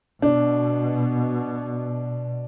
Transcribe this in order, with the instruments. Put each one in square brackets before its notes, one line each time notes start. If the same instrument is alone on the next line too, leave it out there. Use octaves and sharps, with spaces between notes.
[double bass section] B2 [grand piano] D4